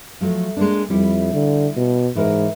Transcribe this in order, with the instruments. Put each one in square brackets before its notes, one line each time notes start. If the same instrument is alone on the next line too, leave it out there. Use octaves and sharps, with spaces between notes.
[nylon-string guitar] F3 F#3 A3
G#3 A#3 D4
[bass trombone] F2 [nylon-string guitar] G3 E4
[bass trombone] D3
B2
[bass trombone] G#2 [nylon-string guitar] E3 A#4 D#5